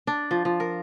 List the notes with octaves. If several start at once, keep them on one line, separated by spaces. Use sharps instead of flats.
D4
F3
F3
A#4